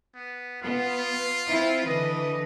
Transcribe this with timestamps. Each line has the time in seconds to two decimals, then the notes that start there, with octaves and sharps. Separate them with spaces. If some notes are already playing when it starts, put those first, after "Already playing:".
0.15 B3
0.62 B3 F4
1.48 C4 E4
1.87 D3 E3 B4 D#5